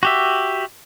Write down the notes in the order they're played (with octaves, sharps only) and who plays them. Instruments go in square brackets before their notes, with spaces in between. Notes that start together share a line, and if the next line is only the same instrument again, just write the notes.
[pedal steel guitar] F#4 G4 E5